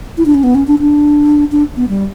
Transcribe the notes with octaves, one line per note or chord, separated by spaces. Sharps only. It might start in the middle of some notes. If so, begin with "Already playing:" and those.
E4
D4
C#4
B3
C#4
D4
D4
D4
B3
G3